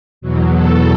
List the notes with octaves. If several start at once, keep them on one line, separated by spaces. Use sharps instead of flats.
E2 B2 F#3
A4